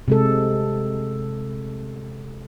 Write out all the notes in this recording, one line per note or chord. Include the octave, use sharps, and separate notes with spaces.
C3 G#3 A4